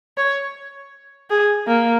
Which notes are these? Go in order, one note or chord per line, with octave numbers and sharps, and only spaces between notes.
C#5
G#4
A#3